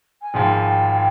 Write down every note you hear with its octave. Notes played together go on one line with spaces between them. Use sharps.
G#5
G#1 G#2 F3 G5
G#5
G5
G5